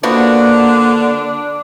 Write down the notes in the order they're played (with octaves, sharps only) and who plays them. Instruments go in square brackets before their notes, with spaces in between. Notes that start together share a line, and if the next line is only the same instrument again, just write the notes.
[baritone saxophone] D3 [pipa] F3 B3 F#4 [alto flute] A#3 [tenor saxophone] D4